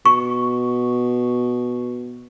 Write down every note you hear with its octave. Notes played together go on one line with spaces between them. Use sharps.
B2 C#6